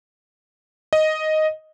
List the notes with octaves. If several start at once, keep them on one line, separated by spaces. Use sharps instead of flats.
D#5